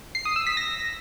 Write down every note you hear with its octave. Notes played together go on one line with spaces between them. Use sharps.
C7
D#6
E6
B6
A#6